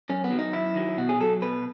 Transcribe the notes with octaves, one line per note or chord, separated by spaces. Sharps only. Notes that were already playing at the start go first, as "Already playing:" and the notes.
F#2 C#4
B3
D#3 F#3
D#4
F#2 E4
D#3 F#3
B2 F#4
G#4
F#3 A4
B2 B4